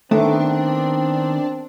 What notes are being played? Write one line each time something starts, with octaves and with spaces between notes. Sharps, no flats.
D#3 A3 B3 C4 D4